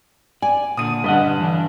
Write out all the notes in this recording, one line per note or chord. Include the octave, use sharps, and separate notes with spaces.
D5 G#5
A#2 D3 D#6 D#7
G2 D3 B4 D#5 F#5
E3 D4